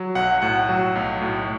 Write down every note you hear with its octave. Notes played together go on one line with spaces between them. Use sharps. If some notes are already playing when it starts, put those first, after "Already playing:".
Already playing: F#3
B1 F#5
A2 F#5
F#3
B1
A2